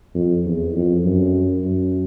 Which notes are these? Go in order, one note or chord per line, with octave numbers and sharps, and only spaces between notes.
F2
E2
F2
F#2
F#2